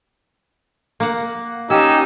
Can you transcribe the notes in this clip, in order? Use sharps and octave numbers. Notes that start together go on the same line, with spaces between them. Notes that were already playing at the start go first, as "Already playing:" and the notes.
A#3 F#5
C#4 D#4 G4 E6